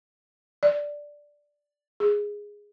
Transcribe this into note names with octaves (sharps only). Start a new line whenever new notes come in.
D5
G#4